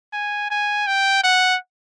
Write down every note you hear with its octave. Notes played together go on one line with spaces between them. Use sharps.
G#5
G#5
G5
F#5